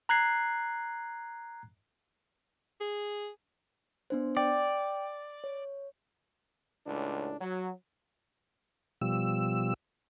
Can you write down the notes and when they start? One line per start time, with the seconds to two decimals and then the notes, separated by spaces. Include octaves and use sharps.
0.09 A#5 F#6 G#6 C7
2.81 G#4
4.10 B3 D4 C5
4.37 D5 G5
5.44 C#5
6.87 C#2 A2 D4
7.40 F#3
9.02 B2 F3 G3 E6